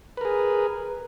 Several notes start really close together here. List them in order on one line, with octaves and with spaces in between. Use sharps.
B4 A#4 G#4